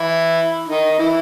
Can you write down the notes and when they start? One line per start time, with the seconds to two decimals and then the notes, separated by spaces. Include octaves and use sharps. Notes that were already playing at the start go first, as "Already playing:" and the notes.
Already playing: E3 E4
0.68 D#3 D#4
0.91 D#4
0.99 E3 E4